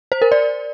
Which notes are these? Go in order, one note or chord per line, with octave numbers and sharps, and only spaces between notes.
C5
A#4
D5